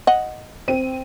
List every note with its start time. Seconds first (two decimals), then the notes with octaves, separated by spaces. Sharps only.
0.07 D#5 F#5
0.68 C4 D#7